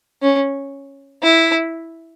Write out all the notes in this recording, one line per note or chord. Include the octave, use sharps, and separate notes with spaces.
C#4
E4